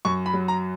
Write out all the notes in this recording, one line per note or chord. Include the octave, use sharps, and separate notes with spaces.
F#2 C#6
B5
F#3
A#5